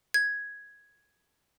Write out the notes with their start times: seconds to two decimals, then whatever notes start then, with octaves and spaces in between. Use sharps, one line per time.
0.14 G#6